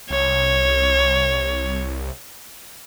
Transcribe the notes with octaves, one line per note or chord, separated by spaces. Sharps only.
C2 C#5